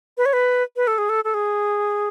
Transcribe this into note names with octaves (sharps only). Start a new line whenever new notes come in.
B4
C#5
B4
B4
A4
G#4
A4
A4
G#4